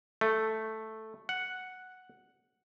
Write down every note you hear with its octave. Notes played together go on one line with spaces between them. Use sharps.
A3
F#5